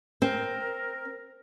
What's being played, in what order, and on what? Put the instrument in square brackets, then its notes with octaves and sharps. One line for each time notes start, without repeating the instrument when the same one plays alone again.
[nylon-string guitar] C4 [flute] A#4